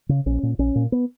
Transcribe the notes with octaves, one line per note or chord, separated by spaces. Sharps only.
C#3
A#1 C#4
A#2
A#1 C#4
A#2
B3